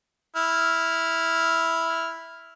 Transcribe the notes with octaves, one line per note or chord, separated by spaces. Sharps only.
E4 F6